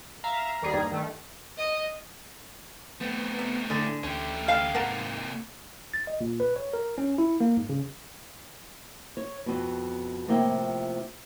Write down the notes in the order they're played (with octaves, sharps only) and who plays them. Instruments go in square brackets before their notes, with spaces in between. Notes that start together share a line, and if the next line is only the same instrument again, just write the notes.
[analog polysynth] E5 F5 [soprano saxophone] A#5
[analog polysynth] D#2 G3 G#4
[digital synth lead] G2
[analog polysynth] D#3 A3
[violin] D#5
[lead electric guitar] A3 C4 [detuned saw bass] B3
[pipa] C3
[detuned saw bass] A2 [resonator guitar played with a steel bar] D3 [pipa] G#4
[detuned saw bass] D2 [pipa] A3 [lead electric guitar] C#4 G4
[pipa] A4 G5 [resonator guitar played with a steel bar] F5
[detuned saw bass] G#2 [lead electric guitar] C3 A#3 [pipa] A#4 F#5 A5
[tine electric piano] A6
D#5
A#2
B4
C#5
A#4
C#4
E4
A#3
G#2
C#3
[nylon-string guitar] C#5
F2 B2
A2 C3 F3 A#3 G5